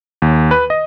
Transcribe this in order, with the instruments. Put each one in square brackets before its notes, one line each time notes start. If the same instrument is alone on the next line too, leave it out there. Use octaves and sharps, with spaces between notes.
[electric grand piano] D#2
B4
D#5